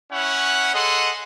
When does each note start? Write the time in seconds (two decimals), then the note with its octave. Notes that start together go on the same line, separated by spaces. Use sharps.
0.12 C#4 E4 C#5 F#5
0.74 G#4 A4 D#5 F#5 C6